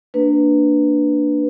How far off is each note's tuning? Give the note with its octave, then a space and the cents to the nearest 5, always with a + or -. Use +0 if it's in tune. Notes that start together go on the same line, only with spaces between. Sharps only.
A#3 -25 D4 +0 B4 +0